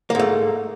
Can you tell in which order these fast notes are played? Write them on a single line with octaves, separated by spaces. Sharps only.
A#3 G#2 A3